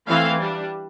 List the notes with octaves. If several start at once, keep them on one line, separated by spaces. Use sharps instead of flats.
E3 A3 C4 F5
G3 D4